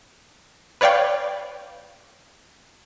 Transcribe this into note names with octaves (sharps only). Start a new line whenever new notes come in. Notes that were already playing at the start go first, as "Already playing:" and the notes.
B4 C#5 D5 F5 G5